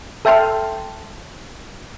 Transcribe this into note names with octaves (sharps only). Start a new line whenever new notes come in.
A4 E5 G5 A5 C6 F6